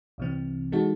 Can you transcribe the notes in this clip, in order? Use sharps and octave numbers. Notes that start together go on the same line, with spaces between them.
C2 C3 E3 C4
E3 G#3 D#4 F#4 A4